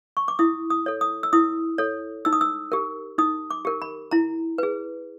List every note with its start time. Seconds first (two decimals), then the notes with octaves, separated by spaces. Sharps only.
0.17 C#6
0.28 D6
0.39 E4 D#6
0.70 D#6
0.86 A4 C#5
1.01 D#6
1.23 E6
1.33 E4 D#6
1.78 A4 C#5
2.25 D#4 E6
2.33 D#6
2.41 E6
2.72 G4 A#4
3.18 D#4 D#6
3.50 D6
3.65 G4 A#4
3.82 B5
4.11 E4 A#5
4.58 G#4 B4